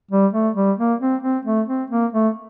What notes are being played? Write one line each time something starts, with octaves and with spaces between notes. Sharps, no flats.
G3
A3
G3
A#3
C4
C4
A3
C4
A#3
A3